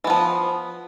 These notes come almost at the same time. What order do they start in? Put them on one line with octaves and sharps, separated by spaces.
E3 B3 F3